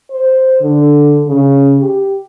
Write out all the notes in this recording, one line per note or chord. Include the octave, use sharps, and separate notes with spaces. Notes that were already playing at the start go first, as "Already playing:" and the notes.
C5
D3
C#3
G4